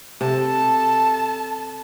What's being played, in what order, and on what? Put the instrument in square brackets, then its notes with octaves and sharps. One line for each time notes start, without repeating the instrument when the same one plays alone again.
[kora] C3 [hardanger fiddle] A4 [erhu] A5